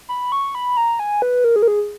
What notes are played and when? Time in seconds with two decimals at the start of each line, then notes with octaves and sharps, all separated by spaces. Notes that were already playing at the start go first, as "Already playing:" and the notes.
0.09 B5
0.32 C#6
0.55 B5
0.77 A#5
0.99 G#5
1.22 B4
1.44 A#4
1.56 G#4
1.62 A#4
1.68 G#4